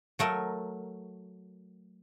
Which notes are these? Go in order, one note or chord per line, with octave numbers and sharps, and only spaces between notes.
F#3 A3 A#4